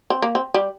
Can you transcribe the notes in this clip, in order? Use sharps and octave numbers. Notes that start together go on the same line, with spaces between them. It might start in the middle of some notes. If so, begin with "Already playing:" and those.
C4
A#3
C4
G3